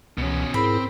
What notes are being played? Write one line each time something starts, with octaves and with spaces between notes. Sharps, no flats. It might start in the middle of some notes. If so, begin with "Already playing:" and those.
C#2 B2 E3 C#4
G#2 C4 E4 G#4 A#4 B5